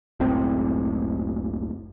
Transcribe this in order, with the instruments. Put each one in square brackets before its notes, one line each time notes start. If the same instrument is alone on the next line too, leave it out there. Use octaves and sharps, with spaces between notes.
[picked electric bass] F#1 C#2 A2 C4